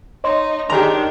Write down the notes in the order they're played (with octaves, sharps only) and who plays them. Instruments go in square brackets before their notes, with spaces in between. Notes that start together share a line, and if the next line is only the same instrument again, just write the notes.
[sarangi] D#4 [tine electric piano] C#5 D#5 C6
[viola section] D#3 [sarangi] D4 [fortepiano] G4 G#4 A#5